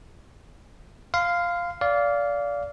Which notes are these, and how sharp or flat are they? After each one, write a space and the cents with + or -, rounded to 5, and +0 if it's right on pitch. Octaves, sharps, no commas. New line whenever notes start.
F5 +0 C6 -35
D5 -25 F5 +0